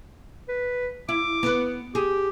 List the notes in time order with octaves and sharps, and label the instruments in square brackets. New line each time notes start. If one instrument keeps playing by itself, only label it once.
[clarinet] B4
[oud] E4 [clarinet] D6
[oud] B3 B4
[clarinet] G4 [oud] G#4